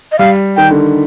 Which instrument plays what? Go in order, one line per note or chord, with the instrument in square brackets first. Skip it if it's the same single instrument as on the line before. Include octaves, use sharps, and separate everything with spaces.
[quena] D#5
[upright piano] G3 [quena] F5
[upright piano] D#3 [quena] G5
[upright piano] D3